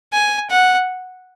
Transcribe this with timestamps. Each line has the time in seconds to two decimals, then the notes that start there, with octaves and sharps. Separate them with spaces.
0.13 G#5
0.50 F#5